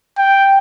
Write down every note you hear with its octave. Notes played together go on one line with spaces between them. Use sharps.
G5